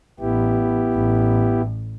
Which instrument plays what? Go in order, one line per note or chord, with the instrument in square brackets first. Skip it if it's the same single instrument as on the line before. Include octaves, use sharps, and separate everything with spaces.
[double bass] A1 [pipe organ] B3 E4 G4
[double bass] A1 A2